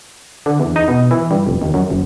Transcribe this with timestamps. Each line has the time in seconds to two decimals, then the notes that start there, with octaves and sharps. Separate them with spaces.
0.46 D3
0.60 E2
0.76 D#4
0.88 B2
1.11 E3
1.31 G2
1.47 F1
1.62 D#2
1.74 F#2
1.90 F#1